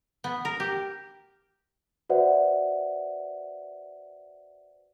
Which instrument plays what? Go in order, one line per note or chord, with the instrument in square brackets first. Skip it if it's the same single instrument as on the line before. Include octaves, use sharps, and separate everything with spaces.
[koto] B3
A#4
G4
[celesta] F#4 B4 C5 D5 E5 F#5